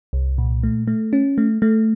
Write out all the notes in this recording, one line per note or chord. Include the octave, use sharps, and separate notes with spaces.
C2
A#2
A3
A3
C#4
A3
A3